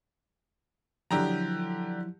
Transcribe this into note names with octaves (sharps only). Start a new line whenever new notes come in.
D3 F3 F#3 E4 G4 A#5